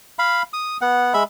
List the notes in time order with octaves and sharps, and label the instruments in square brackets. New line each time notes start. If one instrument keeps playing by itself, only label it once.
[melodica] F5 B5
D#6
B3 F#5
G#3 E5 B5